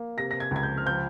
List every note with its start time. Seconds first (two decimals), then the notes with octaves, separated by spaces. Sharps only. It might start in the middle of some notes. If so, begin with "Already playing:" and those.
Already playing: A#3
0.17 C3 A#6
0.31 A#6
0.40 G#6
0.51 C#2 G#6
0.63 G6
0.77 F6
0.86 F3 G6